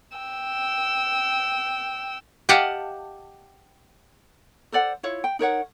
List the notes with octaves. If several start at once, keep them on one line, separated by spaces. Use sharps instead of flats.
G5 E6
G4 D#5 F5 F#5 A5
A4 C5 D5 F#5
E4 F4 C#5
G5
D#4 A#4 C#5 F#5